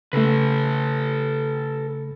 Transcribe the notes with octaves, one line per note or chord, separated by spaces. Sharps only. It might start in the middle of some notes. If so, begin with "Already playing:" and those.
C#3 A3 A4 B4